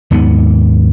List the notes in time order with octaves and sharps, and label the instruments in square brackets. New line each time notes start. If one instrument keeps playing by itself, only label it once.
[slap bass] D#2 G#2 B3